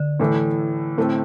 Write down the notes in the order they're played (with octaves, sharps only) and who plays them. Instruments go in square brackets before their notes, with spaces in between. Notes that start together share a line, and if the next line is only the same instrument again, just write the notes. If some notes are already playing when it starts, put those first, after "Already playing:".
Already playing: [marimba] D3
[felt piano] A2 E3 A3
A2 A3 C4 A4